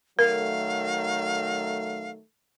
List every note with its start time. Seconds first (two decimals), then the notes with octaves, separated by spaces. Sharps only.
0.19 D#3 F#3 A3 A#4 F5